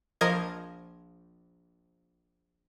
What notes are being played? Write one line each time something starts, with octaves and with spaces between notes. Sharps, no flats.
A#1 F3 A#4 D#5 G#6